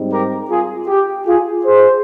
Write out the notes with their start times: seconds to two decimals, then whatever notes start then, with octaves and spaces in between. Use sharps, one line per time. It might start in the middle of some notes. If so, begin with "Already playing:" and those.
Already playing: G#2 G3 C4 D#4
0.11 G4 A#4
0.50 F4 G#4
0.88 G4
1.27 F4 G#4
1.65 G#4 C5